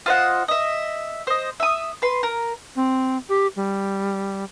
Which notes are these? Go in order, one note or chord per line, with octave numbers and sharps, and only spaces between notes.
F4 C5 D#5 F#5
D#5 E5
C5 D#5
E5 D#6
B4 C6
A#4
C4
G4
G3